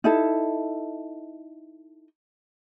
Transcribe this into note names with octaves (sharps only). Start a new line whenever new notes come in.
D#4 E4 A4